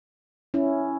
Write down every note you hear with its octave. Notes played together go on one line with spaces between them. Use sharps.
C#4 E4